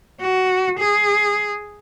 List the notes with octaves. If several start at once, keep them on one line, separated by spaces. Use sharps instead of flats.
F#4
G#4